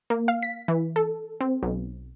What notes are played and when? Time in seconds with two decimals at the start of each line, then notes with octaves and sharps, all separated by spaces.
0.10 A#3
0.28 F5
0.43 B6
0.68 E3
0.96 A4
1.41 C4
1.63 B1